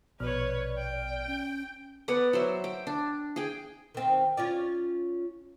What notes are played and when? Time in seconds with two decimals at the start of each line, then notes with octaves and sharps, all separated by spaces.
0.20 A#1 B2 B4 C#5 D5 F6
0.77 G5
1.27 C#4
2.08 B3 B4 D5 F#5
2.33 F#3 C5 E5
2.64 G5
2.87 D4
3.36 G#4 G5
3.95 D#3 C4
4.37 C#4 F4 D5